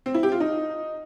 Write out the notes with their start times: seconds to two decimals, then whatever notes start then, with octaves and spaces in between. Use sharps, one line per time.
0.06 C4
0.14 E4
0.23 G4
0.32 F4
0.40 D#4